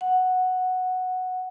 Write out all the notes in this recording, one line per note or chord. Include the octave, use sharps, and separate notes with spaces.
F#5